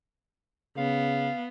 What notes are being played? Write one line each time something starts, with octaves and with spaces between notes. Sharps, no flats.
C#3 B3 F5